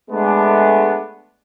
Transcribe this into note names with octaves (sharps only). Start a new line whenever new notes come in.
G#3 A3 B3 D4